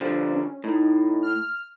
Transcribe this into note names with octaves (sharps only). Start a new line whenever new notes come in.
D3 F3 G3
C#4
A2 D#4
F6